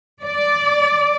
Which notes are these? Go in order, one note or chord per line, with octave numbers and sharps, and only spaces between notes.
D5